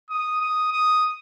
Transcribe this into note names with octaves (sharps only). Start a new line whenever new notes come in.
D#6
D#6
D#6